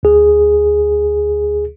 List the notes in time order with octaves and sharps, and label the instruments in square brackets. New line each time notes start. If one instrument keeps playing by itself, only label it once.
[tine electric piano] D2 G#4